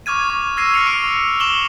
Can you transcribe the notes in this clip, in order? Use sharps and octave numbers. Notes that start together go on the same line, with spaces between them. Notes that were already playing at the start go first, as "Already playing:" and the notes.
C#6 D6 F6 G#6 D#7
C#6
E6 G#6 A#6 C7 D#7
F6 A#6 C7 C#7 D#7 F7
C#6 D7
C#6 D6 E7 F#7 G7